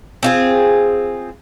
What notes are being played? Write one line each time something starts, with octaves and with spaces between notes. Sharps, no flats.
C4 F4 G#4